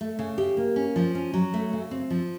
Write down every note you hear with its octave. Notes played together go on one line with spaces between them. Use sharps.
A3
C#3
G4
A#3
C#4
F3
C#4
F#3
A3
C#3
C4
F3